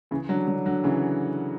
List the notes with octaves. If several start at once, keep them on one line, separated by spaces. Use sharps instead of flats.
C#3 E3
D3 F#3
D3 F#3
D3 F#3
C#3 E3